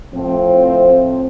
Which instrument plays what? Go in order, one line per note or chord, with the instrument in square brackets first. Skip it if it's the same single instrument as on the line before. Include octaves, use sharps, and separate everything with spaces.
[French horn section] A2 F3 C4